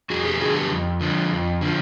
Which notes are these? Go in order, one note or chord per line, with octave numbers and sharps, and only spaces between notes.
F2 F#4 G#4
G4 A4
D3 F3 F#4 G#4
G4 A4
F2
D3 F3
F2
D3 F3